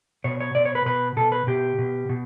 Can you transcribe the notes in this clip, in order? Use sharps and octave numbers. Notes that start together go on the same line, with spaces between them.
B2 C#5
C#5
B2 D5
C#5
B4
B2 B4
B2 A4
B4
B2 G4
B2
B2